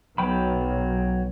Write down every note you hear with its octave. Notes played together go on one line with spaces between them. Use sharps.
B1 F#3 G5 B5